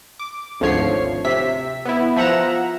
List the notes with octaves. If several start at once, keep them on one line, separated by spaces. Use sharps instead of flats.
D6
G#1 D2 F3 C#5 C7
C3 E5 B6
B3 E4
F3 E5 F#5 A#5 E7